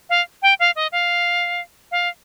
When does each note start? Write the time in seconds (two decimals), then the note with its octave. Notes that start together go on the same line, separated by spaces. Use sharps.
0.10 F5
0.42 G5
0.60 F5
0.76 D#5
0.92 F5
1.91 F5